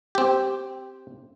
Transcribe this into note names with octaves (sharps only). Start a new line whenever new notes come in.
C4 G4